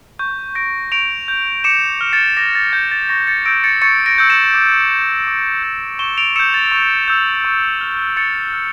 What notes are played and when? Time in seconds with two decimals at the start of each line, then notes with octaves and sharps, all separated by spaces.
0.19 C#6 G6
0.55 G6 A#6 D7
0.92 C#6 D7 F7
1.28 G6
1.64 D6 C#7 E7
2.01 F6
2.13 A6 C#7
2.37 D6 A#6
2.55 A6
2.73 F6 G6
2.91 A6
3.09 C#6 A#6
3.27 A6 C#7
3.45 E6 G6 A#6 D7
3.64 A6 C#7
3.82 C#6 A6 C#7
4.06 A#6 D7
4.18 E6 G6
4.30 C#7 E7
4.54 D6
4.90 G6
5.27 D6
5.63 G6
5.99 C#6 E7 G7
6.17 D7 F7
6.36 E6 G6 C#7 E7
6.54 A6
6.72 C#6
7.08 E6 G6
7.45 C#6
7.81 F6
8.17 C#6 A6 C#7
8.53 F6